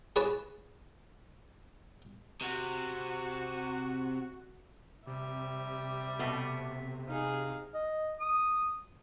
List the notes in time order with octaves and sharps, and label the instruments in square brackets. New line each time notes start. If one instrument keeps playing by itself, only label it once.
[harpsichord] G#4 B4 C#5 A5
[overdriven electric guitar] C3 [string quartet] F#4
[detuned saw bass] C3 [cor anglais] G3 [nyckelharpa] E5
[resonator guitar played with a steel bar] B2 A3 B3
[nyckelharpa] D#4 G#4 [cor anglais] F5
[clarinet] D#5
D#6